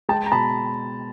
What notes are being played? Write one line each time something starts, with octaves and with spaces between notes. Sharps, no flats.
G#3 G5 A5
A#5
B2 A5 B5